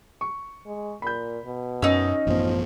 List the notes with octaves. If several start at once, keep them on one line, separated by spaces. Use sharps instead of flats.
C#6
G#3
A#2 B5 G6
B2
F#2 C#4 D#4 E6
A1 F#2 F3 B3